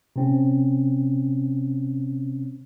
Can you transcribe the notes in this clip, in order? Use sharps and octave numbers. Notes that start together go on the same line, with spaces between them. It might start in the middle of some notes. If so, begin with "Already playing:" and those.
C3 C4 C#4